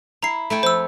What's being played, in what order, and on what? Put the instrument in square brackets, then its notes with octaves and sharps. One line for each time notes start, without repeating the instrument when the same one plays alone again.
[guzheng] E4 [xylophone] A#5 C7
[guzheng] A3 E4 G5
[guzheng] F2 [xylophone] C5 E6